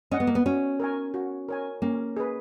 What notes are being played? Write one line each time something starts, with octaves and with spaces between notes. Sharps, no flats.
C#4 D#5 F#5
B3
A#3
B3
C#4 F#4
A#4 C#5 G#5
F#4
A#4 C#5 G#5
A#3 C#4
G#4 B4